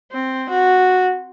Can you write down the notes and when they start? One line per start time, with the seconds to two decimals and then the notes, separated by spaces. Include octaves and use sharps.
0.12 C4
0.50 F#4